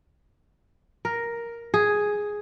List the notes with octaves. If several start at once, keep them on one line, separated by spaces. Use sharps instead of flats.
A#4
G#4